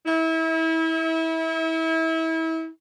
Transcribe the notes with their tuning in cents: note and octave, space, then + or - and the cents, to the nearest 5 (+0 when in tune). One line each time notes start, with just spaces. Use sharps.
E4 -30